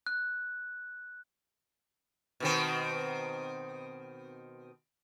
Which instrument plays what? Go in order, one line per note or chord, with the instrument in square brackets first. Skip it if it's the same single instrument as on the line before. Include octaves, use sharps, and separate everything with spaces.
[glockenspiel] F#6
[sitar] B2 D#3 C4